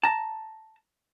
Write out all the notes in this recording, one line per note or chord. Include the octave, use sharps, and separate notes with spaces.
A5 A#5